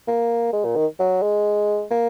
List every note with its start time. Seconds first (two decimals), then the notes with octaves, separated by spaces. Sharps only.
0.07 A#3
0.53 G#3
0.64 A#2
0.76 D#3
0.99 F#3
1.22 G#3
1.91 A#3